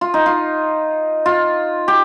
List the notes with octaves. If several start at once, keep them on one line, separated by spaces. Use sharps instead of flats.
F4
D#4
F4
F4
G4